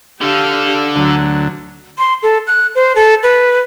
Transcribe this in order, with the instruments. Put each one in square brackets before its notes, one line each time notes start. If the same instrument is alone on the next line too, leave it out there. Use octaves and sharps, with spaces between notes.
[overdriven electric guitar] D3 A4 [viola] G4 F5
[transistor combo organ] D2 [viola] F#3
[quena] C6
A4
F#6
C5
A4
B4